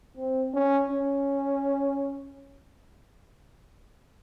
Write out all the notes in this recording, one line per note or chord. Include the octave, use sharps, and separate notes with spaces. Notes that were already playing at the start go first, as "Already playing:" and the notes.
C4
C#4
C#4